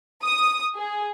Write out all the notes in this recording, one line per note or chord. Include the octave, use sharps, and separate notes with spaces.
D#6
G#4